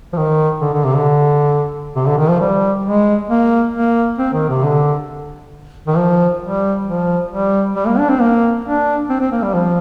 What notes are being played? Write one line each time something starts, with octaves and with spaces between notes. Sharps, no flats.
F3
D#3
D3
D3
C3
D3
C3
D3
D#3
F3
G3
G#3
A#3
A#3
C4
D#3
C3
D3
D#3
F3
G3
F3
G3
G3
A#3
D4
C4
A#3
D4
C4
C4
A#3
G3
F3